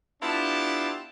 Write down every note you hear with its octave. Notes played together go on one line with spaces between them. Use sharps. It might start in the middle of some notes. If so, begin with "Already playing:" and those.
B3 D4 E4 F4 G4 A5